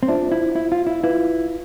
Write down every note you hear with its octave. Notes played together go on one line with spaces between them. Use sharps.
C4
D4 F4 C5 E5
E4
E4
F4
E4
E4 F4 B4 F5